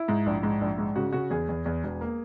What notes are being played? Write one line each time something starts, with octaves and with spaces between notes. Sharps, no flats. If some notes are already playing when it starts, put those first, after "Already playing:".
Already playing: E4
G#2
A#1
G#2
A#1
G#2
C#3 F#4
C#3 F#4
E2 G#4
E2
E2
E1
A#3